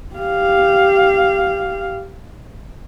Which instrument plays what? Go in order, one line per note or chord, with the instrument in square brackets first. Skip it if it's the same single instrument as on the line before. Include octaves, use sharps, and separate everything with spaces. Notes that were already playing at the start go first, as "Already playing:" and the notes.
[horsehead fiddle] G4 F5